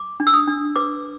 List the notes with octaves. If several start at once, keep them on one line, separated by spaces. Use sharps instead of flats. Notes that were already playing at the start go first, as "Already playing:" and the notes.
Already playing: D6
D4
E6
D#6
D4
B4 D6